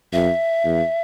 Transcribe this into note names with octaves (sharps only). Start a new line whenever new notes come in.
F2 E5
E2